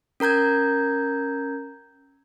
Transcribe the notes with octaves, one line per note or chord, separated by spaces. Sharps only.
C#4 A#4 A#5 G6 G#6